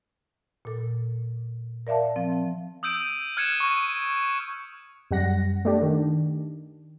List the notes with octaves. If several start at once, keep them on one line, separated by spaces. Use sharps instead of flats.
A#2 A4
A#4 D5 E5 F5 A5
F3 C4
D#6 E6 G6 D7 D#7
F6 F#6 G#6 C#7 D#7 E7
C#6
F#2 G3 F#5 A#6
A3 D4 G4
D#3